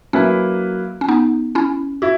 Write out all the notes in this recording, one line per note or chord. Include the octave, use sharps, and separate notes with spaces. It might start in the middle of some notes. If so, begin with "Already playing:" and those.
F#3 A#3 C#4 E4 B4
C#4
B3 D#4
C#4 E4
E4 F#4